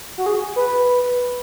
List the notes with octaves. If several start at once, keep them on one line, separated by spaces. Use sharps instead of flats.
F#4
G#4
B4